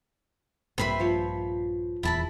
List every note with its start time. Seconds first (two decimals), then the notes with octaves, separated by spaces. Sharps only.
0.78 A#1 G2 A#2 C4 B4 E5 B5 C6
1.00 F3 C#5
2.03 D#1 E2 E4 A5 B5